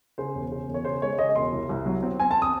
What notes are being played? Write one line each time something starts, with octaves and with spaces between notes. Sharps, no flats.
C#3 C5
E1
C#3
E1
C#5
C#3 C5
G#3 C#5
C#3 D#5
E1 C6
C2
C2
F#3
C4
C4 G#5
A5
D#6